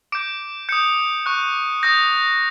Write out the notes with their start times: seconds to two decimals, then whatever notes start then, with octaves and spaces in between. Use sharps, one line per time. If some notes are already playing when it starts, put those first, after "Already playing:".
0.12 D6 G6 D7
0.69 D#6 G6 C#7
1.26 C#6 F#6
1.83 D#6 G6 A#6